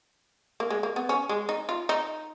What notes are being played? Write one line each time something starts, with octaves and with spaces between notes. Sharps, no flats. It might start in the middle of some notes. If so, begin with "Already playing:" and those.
A#3
G#3
A#3
B3
C#4
G#3
D#4
F4
D#4